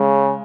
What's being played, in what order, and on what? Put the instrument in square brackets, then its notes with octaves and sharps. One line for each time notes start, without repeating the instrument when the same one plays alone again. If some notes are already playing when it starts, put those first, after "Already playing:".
Already playing: [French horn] C#3 [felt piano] G#3